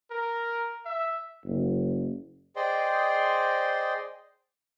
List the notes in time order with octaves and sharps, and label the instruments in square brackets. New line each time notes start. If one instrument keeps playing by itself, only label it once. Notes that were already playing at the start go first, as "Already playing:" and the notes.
[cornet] A#4
E5
[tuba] F#1
[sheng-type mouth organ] G#4 C5 D5 D#5 G5 C6